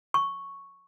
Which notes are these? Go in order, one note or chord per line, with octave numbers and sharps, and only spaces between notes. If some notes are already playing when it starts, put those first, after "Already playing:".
C#6